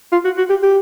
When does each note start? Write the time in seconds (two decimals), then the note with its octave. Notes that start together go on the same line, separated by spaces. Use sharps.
0.12 F4
0.25 F#4
0.38 F#4
0.50 G4
0.63 G4